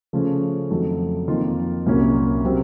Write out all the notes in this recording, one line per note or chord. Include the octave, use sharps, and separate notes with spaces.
C#3 F3 A3 C#4
F2 D#3 F#3 A3
F2 D#3 A#3 F4
C2 A#2 F#3 A#3 C#4
C3 F#3 C4